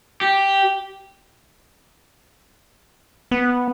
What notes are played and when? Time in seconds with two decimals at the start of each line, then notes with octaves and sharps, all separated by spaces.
0.21 G4
3.31 B3